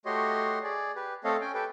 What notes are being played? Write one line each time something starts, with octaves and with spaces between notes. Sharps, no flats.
A3 F#4 G4 C#5 D#5 C6
G#4 D5
G4 B4
A3 C4 A4 C#5 D#5 F5
C#4 G5 G#5
G4 A4 B4 G5